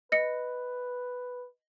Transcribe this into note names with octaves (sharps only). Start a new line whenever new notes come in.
B4 D#5 C#7